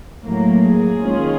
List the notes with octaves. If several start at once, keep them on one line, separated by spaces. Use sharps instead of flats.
A2 F#3 A#3
G#4
D#3 G#3 C#4 F4